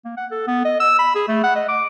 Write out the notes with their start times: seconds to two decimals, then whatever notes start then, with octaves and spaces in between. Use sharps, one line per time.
0.05 A#3
0.17 F#5
0.31 A4
0.47 B3
0.65 D#5
0.80 E6
0.99 B5
1.15 G#4
1.28 A3
1.44 F#5
1.56 D#5
1.69 D6